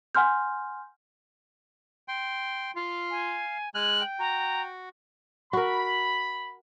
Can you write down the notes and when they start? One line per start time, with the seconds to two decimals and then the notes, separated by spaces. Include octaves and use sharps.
0.15 F#5 G#5 C6 F6 G6
2.08 G5 C6
2.76 F4 F5
3.11 G#5
3.75 G#3 G#5 F6 F#6 F#7
4.01 G5
4.19 F#4 A#5
5.53 F#4 A#4 B5